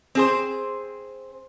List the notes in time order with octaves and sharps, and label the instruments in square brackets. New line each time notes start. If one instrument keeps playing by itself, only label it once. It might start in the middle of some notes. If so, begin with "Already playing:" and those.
[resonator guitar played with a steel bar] C4 G#4 C5